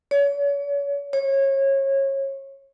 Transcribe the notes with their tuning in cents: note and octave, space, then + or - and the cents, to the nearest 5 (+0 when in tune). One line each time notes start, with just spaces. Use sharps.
C#5 +40
C#5 -25